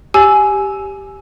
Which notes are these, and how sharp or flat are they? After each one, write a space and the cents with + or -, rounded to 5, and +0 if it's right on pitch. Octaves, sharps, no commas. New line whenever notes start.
G4 +0 G#5 +15 E6 +0